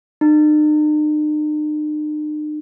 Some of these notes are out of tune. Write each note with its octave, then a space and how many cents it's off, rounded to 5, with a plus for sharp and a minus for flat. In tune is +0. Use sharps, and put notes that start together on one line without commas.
D#4 -45